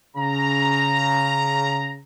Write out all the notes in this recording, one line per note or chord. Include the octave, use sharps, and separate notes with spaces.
C#3 A#5